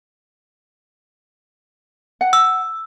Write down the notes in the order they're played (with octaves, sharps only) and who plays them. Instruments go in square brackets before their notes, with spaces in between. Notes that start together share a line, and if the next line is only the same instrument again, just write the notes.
[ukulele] F#5
[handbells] E6